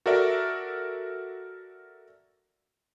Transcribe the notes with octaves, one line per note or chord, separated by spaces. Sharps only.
F#4 A4 A#4 D5 E5